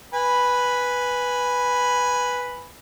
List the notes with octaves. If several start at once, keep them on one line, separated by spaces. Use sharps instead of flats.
B4 G#5 B5